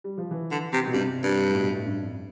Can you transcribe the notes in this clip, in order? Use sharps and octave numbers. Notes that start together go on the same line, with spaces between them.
G3
F3
E3
D3
C3
B2
G2 C3
G2
A2
B2
A2
G2
F2